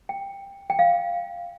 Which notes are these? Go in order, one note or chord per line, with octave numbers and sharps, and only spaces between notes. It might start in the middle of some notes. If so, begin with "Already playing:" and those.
G5
G5
F5